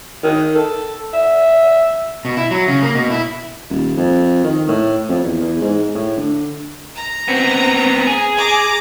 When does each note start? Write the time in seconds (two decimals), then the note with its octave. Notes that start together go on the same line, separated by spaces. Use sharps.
0.23 D#3
0.55 A4
1.13 E5
2.25 B2
2.37 E4
2.51 F#3
2.68 C#3
2.82 A#3
2.95 B2
3.10 E4
3.70 D#1
3.97 F2
4.44 D#3
4.68 A2
5.09 F2
5.24 E2
5.41 E2
5.61 G#2
5.95 A2
6.18 D3
6.95 A#5
7.28 B3 C4
8.07 G#4
8.37 A#5 D6